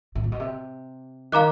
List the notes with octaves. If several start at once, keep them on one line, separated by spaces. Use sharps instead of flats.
A2
A#2
B2
C3
D#3 F5 A#5 D6 F#6